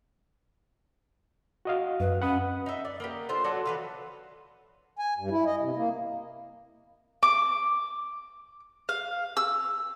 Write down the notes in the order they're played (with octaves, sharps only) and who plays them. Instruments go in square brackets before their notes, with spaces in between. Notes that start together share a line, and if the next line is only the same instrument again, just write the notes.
[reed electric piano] F#4 D#5 F5
[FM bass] F#2 [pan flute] B4
[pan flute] C#4 [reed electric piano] F#5 B5 D#6
[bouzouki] D#4 E5
D5
A#3 B3 G4
D4 F4 A4 C5
F#3 F#4 A4 D5
E3 B4 F5
[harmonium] G#5
G2
E4
D#5
C3
A#3
[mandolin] D6
F5
E6